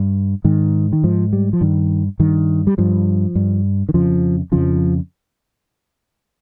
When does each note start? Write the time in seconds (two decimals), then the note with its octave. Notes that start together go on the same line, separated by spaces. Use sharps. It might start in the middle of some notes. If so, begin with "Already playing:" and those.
Already playing: G2
0.44 G#2 D#3
0.93 D#3
1.04 G#2 F3
1.33 G3
1.53 F3
1.61 G2 D#3
2.19 G2 D#3
2.67 G3
2.78 G2 F3
3.35 G2
3.89 D#3
3.94 F2 C#3 F3
4.52 F2 C#3 F3